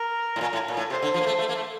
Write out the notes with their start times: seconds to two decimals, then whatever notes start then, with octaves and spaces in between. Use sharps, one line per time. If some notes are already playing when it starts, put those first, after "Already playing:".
Already playing: A#4
0.36 A2
0.41 A#2
0.53 A2
0.68 A#2
0.77 A2
0.90 C3 C5
1.02 D3
1.14 F3
1.21 A#3
1.26 A3
1.39 A3
1.49 A#3
1.55 A3